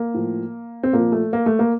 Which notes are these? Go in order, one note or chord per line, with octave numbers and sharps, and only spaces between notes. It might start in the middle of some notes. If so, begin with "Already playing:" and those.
Already playing: A#3
A2 F3
C4
A#2 F3 A#3
A3
A#3
A3
A#3